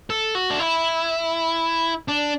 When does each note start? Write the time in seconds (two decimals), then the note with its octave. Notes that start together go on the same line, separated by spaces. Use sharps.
0.10 A4
0.35 F#4
0.51 D4
0.60 E4
2.08 D4